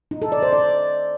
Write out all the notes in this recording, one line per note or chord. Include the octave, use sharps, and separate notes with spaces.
D#4
A4
D5
C5
D5